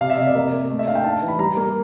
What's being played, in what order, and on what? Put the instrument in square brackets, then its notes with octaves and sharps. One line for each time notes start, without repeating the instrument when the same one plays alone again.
[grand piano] C3 F5
E5
C3 D#5
D5
A#3
A#3
A3 D#5
E5
D4 F5
G5
D#4 A5
E3
B5
G3 A#5
A#3